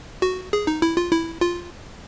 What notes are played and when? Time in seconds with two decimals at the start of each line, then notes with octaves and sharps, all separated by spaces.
0.22 F#4
0.53 G#4
0.67 D#4
0.82 E4
0.97 F4
1.12 E4
1.41 F4